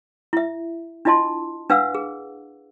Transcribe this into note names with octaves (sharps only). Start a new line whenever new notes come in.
E4 E5
D4 E4 F4 D#5 A5 C6
D4 B4 F5 F#5 E6
G#4